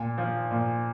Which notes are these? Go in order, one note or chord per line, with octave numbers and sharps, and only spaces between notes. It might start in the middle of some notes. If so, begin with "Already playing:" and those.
Already playing: A#2
F3
A#2